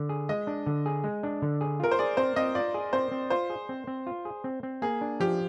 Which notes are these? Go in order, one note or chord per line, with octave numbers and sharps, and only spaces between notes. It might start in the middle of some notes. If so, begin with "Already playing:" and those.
Already playing: D3
G#4
G#3 D#5
D4
D3
G#4
G#3
D4
D3
G#4
F4 A#4
C5
G#4 D5
C4 C5
C4 D#5
F4 D5
G#4
C4 C5
C4
F4 C5
G#4
C4
C4
F4
G#4
C4
C4
A#3 G#4
D4
F3 G4